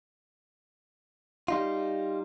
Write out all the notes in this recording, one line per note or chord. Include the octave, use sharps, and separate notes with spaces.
G3 D#4 F4